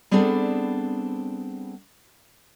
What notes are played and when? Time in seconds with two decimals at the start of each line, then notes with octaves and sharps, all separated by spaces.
0.11 G3 B3 C4 D4 G#4 A4